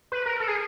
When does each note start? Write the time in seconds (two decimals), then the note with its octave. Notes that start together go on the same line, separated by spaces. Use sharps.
0.12 B4
0.26 A#4
0.40 A4
0.48 G#4